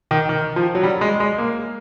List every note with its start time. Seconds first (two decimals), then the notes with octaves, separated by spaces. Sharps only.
0.11 D#3
0.29 D#3
0.56 F3
0.75 F#3
0.83 G3
1.01 G#3
1.20 G#3
1.38 A#3